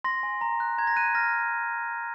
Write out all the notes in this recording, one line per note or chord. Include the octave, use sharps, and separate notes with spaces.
C6 A#6
G#5
A#5
F#6
A#5 G#6
A#6
F#6 D#7
F6 A#6